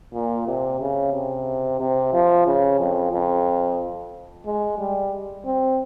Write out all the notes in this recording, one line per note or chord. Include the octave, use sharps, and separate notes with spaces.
A#2
C3
C#3
C3
C3
F3
C#3
F2
F2
G#3
G3
C4